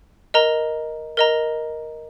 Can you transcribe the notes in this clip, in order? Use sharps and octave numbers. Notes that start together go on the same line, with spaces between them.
A#4 D#5 A#5
A#4 D#5 A#5